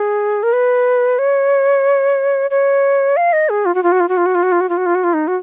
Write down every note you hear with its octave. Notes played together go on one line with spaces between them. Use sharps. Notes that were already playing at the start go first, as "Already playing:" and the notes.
Already playing: G#4
A#4
B4
C#5
C#5
F5
D#5
G#4
F4
F#4
F4
F#4
F4
F#4
F4
F#4
F4
F#4
F4
F#4
F4
F#4
F4
F#4
F4
D#4
F#4